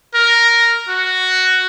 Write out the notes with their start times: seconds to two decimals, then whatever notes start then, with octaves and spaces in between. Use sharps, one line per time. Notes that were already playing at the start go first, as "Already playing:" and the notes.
0.14 A#4
0.89 F#4